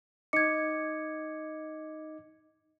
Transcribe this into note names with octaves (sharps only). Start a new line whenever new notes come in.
D#4 D#5 D6 G#6 C#7